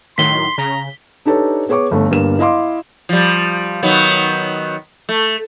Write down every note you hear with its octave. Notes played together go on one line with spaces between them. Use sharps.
A2 D#3 F#3 C6 B6 G7
C#3 A#5
D4 D#4 G4 A4 B4 C#5
B3 G#4 C#5 C#6 D6
G1 A3
G1 G2 A#3 E7
E4 D#5 F5 C6 D6
F3 G3
D#3 F#3 B3
A3